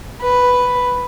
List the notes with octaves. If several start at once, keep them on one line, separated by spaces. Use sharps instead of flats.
B4